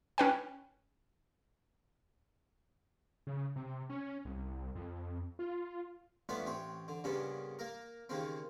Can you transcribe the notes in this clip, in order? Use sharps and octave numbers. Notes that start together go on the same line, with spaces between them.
C#4 B4 G5
C#3
C3
C#4
C2
F2
F4
A3 B3 C#4 D4 F4 B4
A1 C4 C#5
D3
G2 A#2 C#3 B3 C#4 D4
A#3 A#4
D#2 C#3 A#3 C4